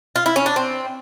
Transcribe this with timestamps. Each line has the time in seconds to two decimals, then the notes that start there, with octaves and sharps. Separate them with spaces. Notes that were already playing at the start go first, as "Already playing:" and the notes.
0.16 F4
0.26 E4
0.36 C#4
0.46 D4
0.56 C4